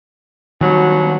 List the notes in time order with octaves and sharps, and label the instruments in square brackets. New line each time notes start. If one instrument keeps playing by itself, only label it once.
[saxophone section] G2 B2 F#3 [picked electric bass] D#3 G3